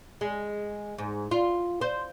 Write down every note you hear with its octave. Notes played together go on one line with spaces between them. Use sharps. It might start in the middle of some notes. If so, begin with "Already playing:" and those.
G#3
G#2
F4
C5